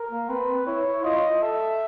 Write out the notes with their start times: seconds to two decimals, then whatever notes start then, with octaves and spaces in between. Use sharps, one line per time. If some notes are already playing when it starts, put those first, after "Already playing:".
Already playing: A#4
0.11 A#3
0.29 C4 B4
0.67 E4 C#5
0.85 E4
1.04 F4 D#5
1.42 A4 E5